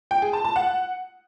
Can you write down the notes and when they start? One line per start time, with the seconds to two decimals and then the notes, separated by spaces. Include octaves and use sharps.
0.11 G5
0.22 G#4
0.33 A5
0.45 A5
0.56 F#5